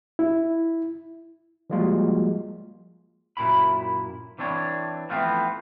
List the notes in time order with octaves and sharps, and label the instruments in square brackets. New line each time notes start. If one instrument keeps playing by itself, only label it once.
[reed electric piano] E4
[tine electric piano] F3 G3 G#3 A#3 F4 F#4
[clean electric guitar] F#2 A#2 E4 B5
E3 C4 D4 C#5
E3 F3 A3 B3 C4